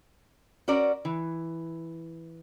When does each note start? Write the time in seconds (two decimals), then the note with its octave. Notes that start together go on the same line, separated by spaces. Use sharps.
0.68 C#4 F#4 A#4 D5
1.05 E3